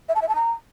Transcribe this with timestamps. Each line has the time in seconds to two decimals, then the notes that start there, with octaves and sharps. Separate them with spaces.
0.09 E5
0.15 A5
0.22 E5
0.29 A5
0.35 A#5